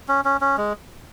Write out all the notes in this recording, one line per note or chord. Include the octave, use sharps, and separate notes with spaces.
C#4
C#4
C#4
G#3